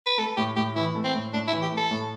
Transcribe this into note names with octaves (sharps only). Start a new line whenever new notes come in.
B4
A3 A4
A2 G4
A2 G4
E3 E4
A3
C4
A2
A2 D4
E4
E3
G4
A3 A4
A2